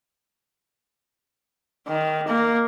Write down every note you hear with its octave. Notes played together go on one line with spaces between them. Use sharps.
D#3
A#3